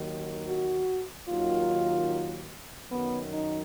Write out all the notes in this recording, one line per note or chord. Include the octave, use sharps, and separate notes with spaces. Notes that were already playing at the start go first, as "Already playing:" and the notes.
Already playing: D#2 D#3 F#3
F#4
D#2 D#3 F#3 F4
F#2 D#3 F#3 B3
D#4